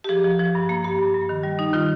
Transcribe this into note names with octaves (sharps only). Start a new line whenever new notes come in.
G4
F3 G#4
F3
F3
G2
A#3
G2 G4
G2
G2
D#3
G3
G3 D#4
D#3 F4